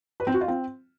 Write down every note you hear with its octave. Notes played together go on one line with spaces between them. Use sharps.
B4
C4
F#4
F4
C4